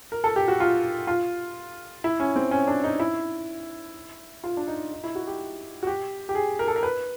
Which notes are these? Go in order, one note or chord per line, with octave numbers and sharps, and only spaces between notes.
A#4
A4
G4
F#4
F4
F4
E4
C#4
C4
C#4
D4
D#4
E4
F4
D4
D#4
D#4
E4
F#4
G4
F#4
G4
G4
G#4
A#4
A4
A#4
B4